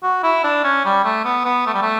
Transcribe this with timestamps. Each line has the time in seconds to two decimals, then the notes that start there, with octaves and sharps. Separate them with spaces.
0.03 F#4
0.23 E4
0.44 D4
0.64 C#4
0.85 G3
1.05 A3
1.25 B3
1.45 B3
1.66 A3
1.74 G3
1.82 A3